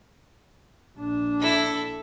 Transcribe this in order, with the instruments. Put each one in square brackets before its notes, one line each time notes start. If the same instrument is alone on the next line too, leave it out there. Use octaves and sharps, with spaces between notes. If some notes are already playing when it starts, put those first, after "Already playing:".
[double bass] A#1 D4
[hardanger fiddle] E4 A4